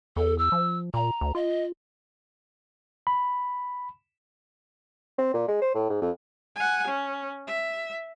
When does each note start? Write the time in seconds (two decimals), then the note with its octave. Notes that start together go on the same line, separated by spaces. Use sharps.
0.16 E2 A4
0.38 E6
0.52 F3
0.94 A#2 A#5
1.21 D2
1.35 F4 D#5
3.07 B5
5.18 C4
5.34 A#2
5.48 G#3
5.62 C5
5.75 A2
5.90 G#2
6.02 F2
6.56 F#5 G#5
6.87 C#4
7.47 E5